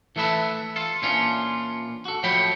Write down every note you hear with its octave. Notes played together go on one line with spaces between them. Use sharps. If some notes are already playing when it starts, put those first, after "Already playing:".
E3 A3 A4 B4 E5
F4 A4
A#2 E3 C#4 D4 F4
F#4 A4
A2 F3 F#3 C#5 G5 B5